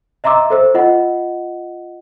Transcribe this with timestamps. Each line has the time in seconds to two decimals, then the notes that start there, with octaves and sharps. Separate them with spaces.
0.24 D#5 E5 A#5 C6 D6 E6
0.50 A4 C5 E6
0.74 F4 D#5 F#5